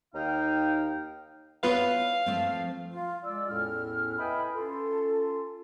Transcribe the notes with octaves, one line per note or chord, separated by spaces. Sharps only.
D#2 D#4 F5 G5
B3 E4 F4 B4 C#5 F5
F3 A3 C4
F4
G#3 F4 D5 E6
E2 A2 C#4 E4 A4 F6
B4 D#5 E5 G5 G#5 B5
C#4 F4 A4